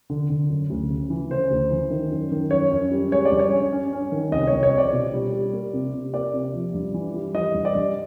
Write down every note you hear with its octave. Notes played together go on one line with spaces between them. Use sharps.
D3
D3
F#2
D2
C#3
E3
C#3 C5
D2
E3
D#3
F#2
D#3
F#2 C#5
F#2
G3
G#3 C#5
D5
G2
C#5
C#4
C#4
C#4
D#3
C2 D#5
C#5
C2
C#5
C4 D5
B2
G3
G3
A#3
C3
C3
A#3 D5
C3
F3
G2
E3
G3
E3 D#5
G2
D5
G2